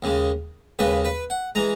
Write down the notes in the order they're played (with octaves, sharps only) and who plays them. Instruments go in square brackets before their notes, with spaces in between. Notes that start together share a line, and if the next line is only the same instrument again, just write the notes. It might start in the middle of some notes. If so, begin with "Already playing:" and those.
[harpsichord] D#2 C#3 G#3
D#2 C#3 G#3 B4
B4
F#5
E3 G#3 A#5